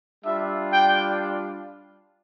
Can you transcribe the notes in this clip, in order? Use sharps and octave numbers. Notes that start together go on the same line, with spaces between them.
G3 D4 F4 E5
G5